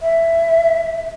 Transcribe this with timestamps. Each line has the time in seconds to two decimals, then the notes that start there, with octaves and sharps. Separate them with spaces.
0.02 E5